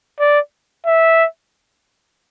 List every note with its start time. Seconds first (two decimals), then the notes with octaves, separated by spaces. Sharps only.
0.20 D5
0.86 E5